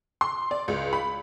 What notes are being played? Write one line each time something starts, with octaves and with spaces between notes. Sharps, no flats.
C6
D5
C#2
B5